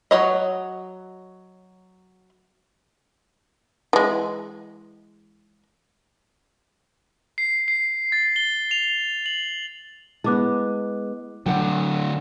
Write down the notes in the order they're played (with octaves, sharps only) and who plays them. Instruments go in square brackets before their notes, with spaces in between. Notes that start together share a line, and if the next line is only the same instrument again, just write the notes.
[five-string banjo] F#3 C#5 D#5
[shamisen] E3 G#3
[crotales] C7
C7
A6
G7
F7
F#7
[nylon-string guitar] G#3 B3 [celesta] E4 D6 F#6
[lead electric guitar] A2 D3 [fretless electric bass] F#3 [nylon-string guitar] F#5 G5